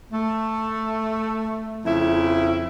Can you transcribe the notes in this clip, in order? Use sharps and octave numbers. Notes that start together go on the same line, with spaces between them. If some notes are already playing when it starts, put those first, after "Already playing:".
A3
F2 C#3 E4